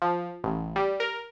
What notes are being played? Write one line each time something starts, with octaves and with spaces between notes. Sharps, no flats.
F3
A1
G3
A#4